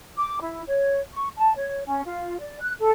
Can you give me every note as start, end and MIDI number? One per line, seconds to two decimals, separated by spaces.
0.16 0.39 86
0.40 0.62 64
0.67 0.99 73
1.13 1.28 85
1.36 1.53 81
1.56 1.81 73
1.86 2.01 61
2.05 2.38 65
2.39 2.58 74
2.60 2.72 90
2.79 2.91 69